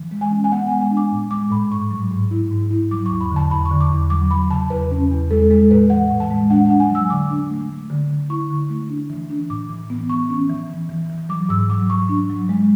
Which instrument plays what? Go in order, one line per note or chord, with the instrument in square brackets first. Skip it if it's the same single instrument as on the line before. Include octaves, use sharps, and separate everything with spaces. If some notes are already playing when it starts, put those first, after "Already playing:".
Already playing: [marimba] E3
G#3
G#5
C#4
G#5
B3 F#5
G#5
G#3
G#5
D4
D6
A2
G#3 D6
A2 B5
G#2 C#6
F#3
G#2
E4
G#2
E4
F#3 D6
C#6
E2
B5
D3 A5
E2 B5
C#6
D3
D6
E2
F#3 D6
F#3 B5
C#3 A5
E2 B4
C#4
E2
G#3 A4
G#3 A4
A2 B4
E3 F#5
A2
A5
G#3
D4 F#5
F#5
D4
G#5
F#3
E6
D3 D6
D4
A3
A3
D3
D3
E4 C#6
D3
A3
D4
E3
D4
A2 D6
E3
B3
E3 C#6
C#4
E3
E3
E3
E3
F#3 D6
G#2 E6
F#3 D6
F#3 C#6
D4
F#3
G#3